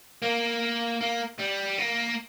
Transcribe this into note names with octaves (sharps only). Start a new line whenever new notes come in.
A#3
A#3
G3
A#3